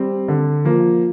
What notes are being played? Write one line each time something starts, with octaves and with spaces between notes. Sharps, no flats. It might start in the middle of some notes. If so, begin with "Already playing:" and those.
Already playing: G3 C4
D3
F3 A#3